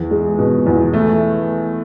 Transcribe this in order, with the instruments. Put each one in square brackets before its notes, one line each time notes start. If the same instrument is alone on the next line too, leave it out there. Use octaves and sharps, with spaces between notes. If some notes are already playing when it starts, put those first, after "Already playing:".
Already playing: [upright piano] E2
G#3
B2
E2
A3